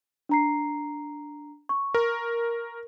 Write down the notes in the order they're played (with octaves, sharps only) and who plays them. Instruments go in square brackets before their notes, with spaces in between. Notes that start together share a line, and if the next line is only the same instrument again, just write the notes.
[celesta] D4 A#5 C7
C#6
[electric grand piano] A#4